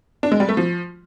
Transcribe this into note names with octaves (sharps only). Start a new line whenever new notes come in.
D4
G#3
G3
A3
F3